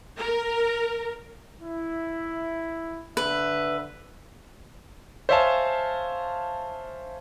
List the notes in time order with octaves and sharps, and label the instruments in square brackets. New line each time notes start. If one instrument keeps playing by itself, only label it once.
[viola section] A#4
[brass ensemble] E4
[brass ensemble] D3 E5 [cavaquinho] B4
[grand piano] C5 C#5 E5 F5 G#5 A5